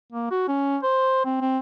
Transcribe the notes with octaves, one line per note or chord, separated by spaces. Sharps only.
A#3
F#4
C#4
C5
C4
C4